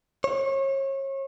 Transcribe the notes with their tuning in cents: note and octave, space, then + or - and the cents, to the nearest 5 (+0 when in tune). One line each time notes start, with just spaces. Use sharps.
C#5 -35